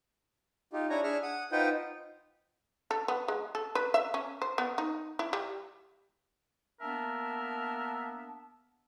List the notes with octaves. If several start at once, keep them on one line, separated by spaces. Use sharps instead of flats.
D#4 F4 G4
D4 E4 C#5 G#5 A#5
D4 G#4 E5 C#6 F6
F#5 D#6
D#4 F4 B4 C5 F#5 G5
A4
B3
G#3
A4
B4
E5
C#4
C5
B3
D#4
E4
G3
A#3 B3 D4 A#4 E5 A5